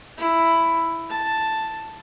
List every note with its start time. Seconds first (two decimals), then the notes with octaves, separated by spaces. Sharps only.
0.18 E4
1.10 A5